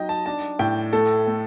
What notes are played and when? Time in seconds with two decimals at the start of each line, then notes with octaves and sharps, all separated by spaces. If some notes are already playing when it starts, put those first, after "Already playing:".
Already playing: F#3 D#4 D#5 G5
0.09 A5
0.26 D4 A5
0.59 A2 G5
0.93 A3 A4
1.27 A3